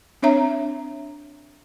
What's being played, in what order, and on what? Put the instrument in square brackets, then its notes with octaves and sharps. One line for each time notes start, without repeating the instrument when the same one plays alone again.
[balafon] C4 D4 C#5 E5 A#5